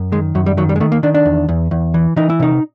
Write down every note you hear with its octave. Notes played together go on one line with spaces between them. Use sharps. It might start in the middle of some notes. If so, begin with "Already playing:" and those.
Already playing: F#2
D#3 G#3
F#2 F#3
G3
D#3 F#3
G3
G#3
D#3 A3
A#3
D#3 D4
D4
E2
E2
E2
E3
E3 D#4
E4
C3 D#4